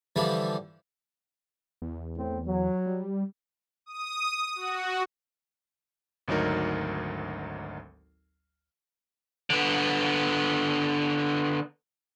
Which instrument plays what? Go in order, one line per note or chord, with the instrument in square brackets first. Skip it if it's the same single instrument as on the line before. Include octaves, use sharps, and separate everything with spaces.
[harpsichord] D3 E3 F3 G3 E4
[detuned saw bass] E2
[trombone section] A2 C4
F#3
[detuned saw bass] G3
[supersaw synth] D#6
F#4
[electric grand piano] G#1 D2 F#3 D#4 A#4
[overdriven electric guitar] D3 B3